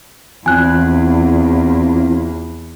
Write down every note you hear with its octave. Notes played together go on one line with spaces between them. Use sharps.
E2 E3 C4 F4 G#5 F#6